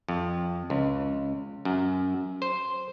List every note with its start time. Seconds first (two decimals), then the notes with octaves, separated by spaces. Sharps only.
0.09 F2
0.70 C#2
1.65 F#2
2.42 C5